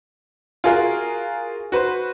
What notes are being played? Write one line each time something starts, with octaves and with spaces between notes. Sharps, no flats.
F4 F#4 G#4 A#4 F5
F#4 B4 C5